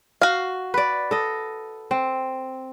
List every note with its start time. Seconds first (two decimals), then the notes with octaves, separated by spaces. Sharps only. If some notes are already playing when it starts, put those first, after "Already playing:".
0.22 F#4 F5
0.74 B4 D5
1.11 A4 D#5
1.91 C4